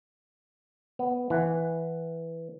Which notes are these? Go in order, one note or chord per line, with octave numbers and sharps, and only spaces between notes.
B3
E3 F#5